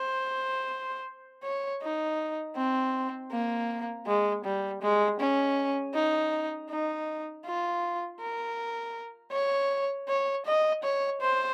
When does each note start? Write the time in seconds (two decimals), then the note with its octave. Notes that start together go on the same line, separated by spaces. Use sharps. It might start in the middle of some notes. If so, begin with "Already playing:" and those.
Already playing: C5
1.44 C#5
1.82 D#4
2.57 C4
3.32 A#3
4.06 G#3
4.44 G3
4.82 G#3
5.20 C#4
5.94 D#4
6.70 D#4
7.45 F4
8.21 A#4
9.32 C#5
10.09 C#5
10.46 D#5
10.83 C#5
11.21 C5